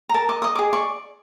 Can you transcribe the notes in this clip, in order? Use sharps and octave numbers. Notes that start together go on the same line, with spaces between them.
A#5
A#4 A5
D#5 D6
D#5 D#6
G#4 D6
D5 C#6